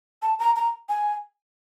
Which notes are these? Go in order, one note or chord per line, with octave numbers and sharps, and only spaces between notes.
A5
A#5
A#5
G#5